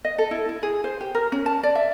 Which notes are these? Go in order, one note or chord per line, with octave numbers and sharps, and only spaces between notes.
D#5
A4
E4
E4
G#4
C5
G4
A#4
C#4
A5
D5
E5